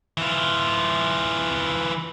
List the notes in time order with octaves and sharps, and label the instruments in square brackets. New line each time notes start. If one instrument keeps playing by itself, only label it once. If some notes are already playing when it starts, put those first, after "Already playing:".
[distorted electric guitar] E3 F4